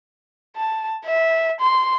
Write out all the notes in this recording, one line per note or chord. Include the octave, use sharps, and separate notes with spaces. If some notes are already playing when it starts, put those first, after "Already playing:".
A5
E5
C6